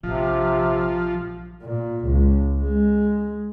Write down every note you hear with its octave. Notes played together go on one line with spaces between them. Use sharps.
A#1 C3 F3
A#2
C#2
G#3